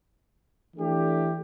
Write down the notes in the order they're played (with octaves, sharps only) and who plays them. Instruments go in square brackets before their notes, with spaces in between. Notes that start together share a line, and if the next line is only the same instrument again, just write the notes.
[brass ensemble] E3 A3 D4 G4